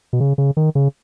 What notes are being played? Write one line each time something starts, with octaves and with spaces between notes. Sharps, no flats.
B2
C#3
C#3
D#3
C#3